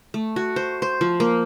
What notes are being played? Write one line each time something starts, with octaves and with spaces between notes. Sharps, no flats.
A3
F#4
C5
C5
F3
A#3